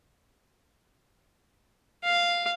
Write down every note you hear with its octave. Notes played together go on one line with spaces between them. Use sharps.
F5